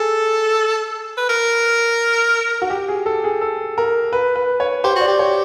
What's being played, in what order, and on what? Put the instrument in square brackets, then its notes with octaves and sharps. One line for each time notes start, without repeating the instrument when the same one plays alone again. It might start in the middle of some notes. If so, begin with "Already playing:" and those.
Already playing: [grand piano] G#4 [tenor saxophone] A4
[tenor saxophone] B4
A#4
[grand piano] F#4
G4
G#4
A4
G#4
A4
A#4
B4
B4
C#5
[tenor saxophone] G4 [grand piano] C5
[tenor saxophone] F#4 [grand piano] D5
[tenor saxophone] G4
[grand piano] C#5